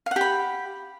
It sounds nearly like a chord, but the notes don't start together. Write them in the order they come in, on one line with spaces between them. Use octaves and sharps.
F5 F#5 G4 B5